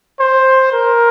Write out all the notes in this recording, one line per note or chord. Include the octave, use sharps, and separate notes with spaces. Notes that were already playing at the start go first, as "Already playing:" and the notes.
C5
A#4